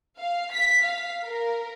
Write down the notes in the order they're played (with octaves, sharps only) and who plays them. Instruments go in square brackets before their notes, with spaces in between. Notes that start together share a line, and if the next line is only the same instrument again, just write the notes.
[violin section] F5
B6
F5
A#4